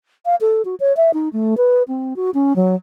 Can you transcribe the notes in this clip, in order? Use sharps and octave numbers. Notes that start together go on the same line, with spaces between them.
F5
A4
F#4
C#5
E5
D#4
A3
B4
C4
F#4
C#4
F#3